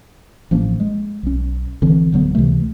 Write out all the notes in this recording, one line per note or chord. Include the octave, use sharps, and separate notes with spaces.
A1 F3 A#3 C#4
G#3
B1 C#4
A#1 D3 E3 C4
D1 D3 F#3 B3
C#2 C3 E3 A3